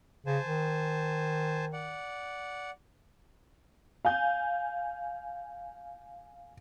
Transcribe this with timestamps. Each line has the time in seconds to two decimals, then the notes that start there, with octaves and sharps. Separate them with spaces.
0.26 C#3 C5 G#5 A5
0.46 D#3
1.73 D5 F#5
4.05 F5 G#5 G6